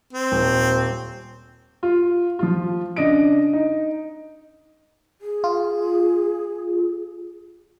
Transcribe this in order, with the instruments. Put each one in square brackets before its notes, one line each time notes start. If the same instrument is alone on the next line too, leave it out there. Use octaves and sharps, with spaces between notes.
[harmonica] C4
[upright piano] D#1
F4
F3 F4
C#3 D4 D#5 D7
D#4
[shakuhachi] G#4
[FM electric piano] F4